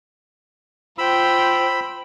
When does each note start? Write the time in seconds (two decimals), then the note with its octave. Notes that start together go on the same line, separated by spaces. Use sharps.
0.98 F4 C5 G5 B5 E6